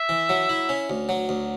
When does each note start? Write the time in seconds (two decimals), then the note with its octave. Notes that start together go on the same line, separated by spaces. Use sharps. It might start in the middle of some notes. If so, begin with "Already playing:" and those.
Already playing: E5
0.09 E3
0.29 F#3
0.49 E4
0.69 C#4
0.90 D2
1.09 F#3
1.29 D2